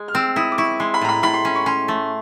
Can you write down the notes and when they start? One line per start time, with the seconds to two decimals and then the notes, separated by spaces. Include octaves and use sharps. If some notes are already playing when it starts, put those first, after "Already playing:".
Already playing: G#3
0.08 F6
0.15 C4 E6
0.36 E4 D#6
0.52 D6
0.58 E4 C#6
0.80 G#3 C6
0.94 B5
1.01 A2 A#5
1.09 B5
1.23 A2 B5
1.34 C6
1.45 C#4
1.55 C#6
1.66 C#4 C6
1.88 A3